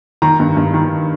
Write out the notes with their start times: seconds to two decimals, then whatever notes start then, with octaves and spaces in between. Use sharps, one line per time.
0.22 D#3 A#5
0.40 G2
0.57 G2
0.74 D#3